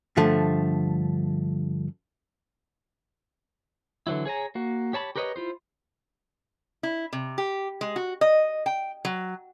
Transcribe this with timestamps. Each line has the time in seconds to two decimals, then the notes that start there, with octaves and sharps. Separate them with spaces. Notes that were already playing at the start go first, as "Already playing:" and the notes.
0.17 G2 D3 F3 A3
4.07 D3 E3 F#3 E4
4.26 G#4 C#5 G#5 A#5
4.55 A#3 F#4
4.93 G4 C#5 A5 B5
5.16 G4 A#4 B4 C#5 D#5
5.36 E4 F4 C5
6.83 E4
7.13 C3
7.38 G4
7.81 G#3
7.96 F#4
8.21 D#5
8.66 G5
9.05 F#3